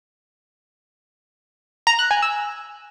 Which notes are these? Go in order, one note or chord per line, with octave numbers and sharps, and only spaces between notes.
A#5
F#6
G#5
E6